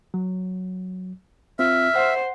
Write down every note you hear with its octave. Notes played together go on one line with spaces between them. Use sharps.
F#3
C4 F4 E5 F6
C5 F#5